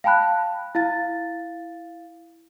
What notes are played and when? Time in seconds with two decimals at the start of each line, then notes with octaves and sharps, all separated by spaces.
0.04 F5 G5 A5 B5 F#6
0.75 E4 F5 A6